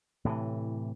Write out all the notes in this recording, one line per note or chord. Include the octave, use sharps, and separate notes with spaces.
A2 C3 D#3 E3